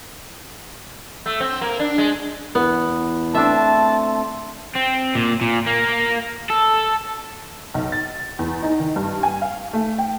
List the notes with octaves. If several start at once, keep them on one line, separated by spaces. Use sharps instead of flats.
A3
C4
A#3
D4
G#3
E2 B3
A3 C4 D4 D5 E5 A5
C4
A#2
A#2
A#3
A4
B1
A6
E2
D#4
D#3
G2
G#5
F5
A3
G5